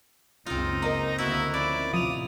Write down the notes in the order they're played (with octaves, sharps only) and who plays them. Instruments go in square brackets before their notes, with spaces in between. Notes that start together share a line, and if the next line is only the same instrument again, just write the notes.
[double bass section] F#1 C#2 C#3 [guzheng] C4 F4 [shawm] D#4
[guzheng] A#3 [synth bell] A#4 D#5 A#5
[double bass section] D2 A#3 B3 [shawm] E4 [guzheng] F#4 E5
[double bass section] F3 C#4 [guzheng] E4 [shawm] D5
[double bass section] A1 D#2 C3 [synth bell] F3 F7 [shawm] D#6